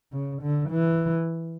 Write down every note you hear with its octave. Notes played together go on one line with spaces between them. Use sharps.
C#3
D3
E3